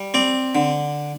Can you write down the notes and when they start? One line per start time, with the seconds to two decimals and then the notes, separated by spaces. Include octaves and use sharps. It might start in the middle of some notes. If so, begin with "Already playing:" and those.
Already playing: G3
0.14 C4 D5
0.55 D3